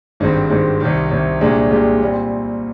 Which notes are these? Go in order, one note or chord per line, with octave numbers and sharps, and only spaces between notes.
G#1 G2 D#3 G#3 C4
G#1 G2 D#3 G#3 C4
C2 C3 D#3
C2 C3 D#3
C2 A#2 G#3 D4 G4
C2 A#2 G#3 D4 G4
A#2 G3 C4